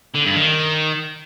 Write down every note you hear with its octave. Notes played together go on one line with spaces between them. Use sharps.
D3
G2
D#3